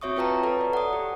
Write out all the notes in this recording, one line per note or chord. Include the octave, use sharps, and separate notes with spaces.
C4 F#4 C#5 E5 C#6 D#6
F4 B4 G5 A5 A#5
A4 B4 A5 A#5
D5
F#5 D#6
G4